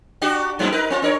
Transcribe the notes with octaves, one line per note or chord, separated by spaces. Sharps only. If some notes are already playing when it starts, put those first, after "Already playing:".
D4 F#4 G4
F#2 A2 E4
D#4 A#4 B4
C4 F4
D4 A#4 C#5